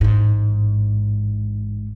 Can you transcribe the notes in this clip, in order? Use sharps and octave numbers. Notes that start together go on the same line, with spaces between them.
A1 G#2